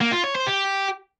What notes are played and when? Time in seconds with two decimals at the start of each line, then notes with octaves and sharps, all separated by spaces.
0.01 A#3
0.12 F4
0.24 C#5
0.35 C5
0.47 G4